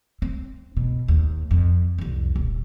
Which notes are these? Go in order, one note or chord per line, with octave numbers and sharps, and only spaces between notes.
C4
B2
D#2
F2
C2 F2
D#1